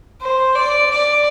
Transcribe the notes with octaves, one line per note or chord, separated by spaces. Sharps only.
C5
D5
D5